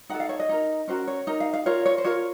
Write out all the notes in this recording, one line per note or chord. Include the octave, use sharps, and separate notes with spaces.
D#4 A4 F#5
F5
C#5
D#5
D#4 A#4
C#4 F#4 A#4 C5
C#5
D#4 A#4
F5
F5
F4 A#4 C#5
C#5
C5
F4 A#4 C#5